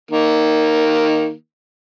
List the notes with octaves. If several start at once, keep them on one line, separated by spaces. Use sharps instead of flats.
D#3 A#3